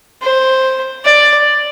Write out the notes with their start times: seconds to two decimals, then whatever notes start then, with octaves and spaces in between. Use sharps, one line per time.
0.23 C5
1.05 D5